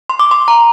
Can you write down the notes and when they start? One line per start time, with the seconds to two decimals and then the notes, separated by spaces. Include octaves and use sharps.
0.10 C6
0.19 D6
0.31 C6
0.48 A#5